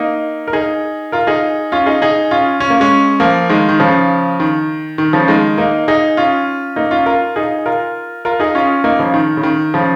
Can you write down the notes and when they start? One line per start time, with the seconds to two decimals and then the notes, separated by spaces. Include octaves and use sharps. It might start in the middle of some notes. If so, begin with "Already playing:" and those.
Already playing: A#3 D#4
0.48 A#4
0.53 D#4 G#4
1.12 F4 A#4
1.27 D#4 G#4
1.72 C#4 F4
1.86 D#4 G#4
2.02 D#4 G#4
2.31 C#4 F4
2.60 C#4
2.70 A#3
2.80 G#3 C#4
3.20 F3 A#3
3.49 D#3 G#3
3.69 D#3
3.80 C#3 F3
4.40 D#3
4.98 D#3
5.13 C#3 F3
5.28 D#3 G#3
5.58 A#3 D#4
5.88 D#4 G#4
6.17 C#4 F4
6.76 A#3 D#4
6.91 C#4 F4
7.06 F4 A#4
7.36 D#4 G#4
7.66 F4 A#4
8.25 F4 A#4
8.40 D#4 G#4
8.55 C#4 F4
8.84 A#3 D#4
8.99 C#3 F3
9.14 D#3
9.37 C#3
9.43 D#3
9.74 C#3 F3